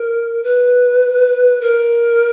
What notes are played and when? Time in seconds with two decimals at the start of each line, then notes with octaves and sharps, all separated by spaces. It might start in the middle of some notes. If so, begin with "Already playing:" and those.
Already playing: A#4
0.43 B4
1.61 A#4